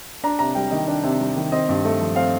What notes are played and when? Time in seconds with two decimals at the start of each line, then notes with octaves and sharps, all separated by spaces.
0.24 D4 A#5
0.39 C3 A#5
0.55 G3 G5
0.71 D#3 D#5
0.88 D4
1.03 C3
1.20 G3
1.37 D#3
1.52 C4 D#5
1.69 G2
1.85 A3
2.01 F3
2.16 C4 F5